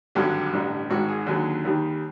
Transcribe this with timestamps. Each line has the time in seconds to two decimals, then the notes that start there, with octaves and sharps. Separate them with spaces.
0.15 G#1 G2 D3 F#3 G4
0.53 A1 G2 D3
0.90 G#1 G#2 D#3 F#4
1.09 G#4
1.26 D#2 D3 F#3
1.65 D#2 D#3 G3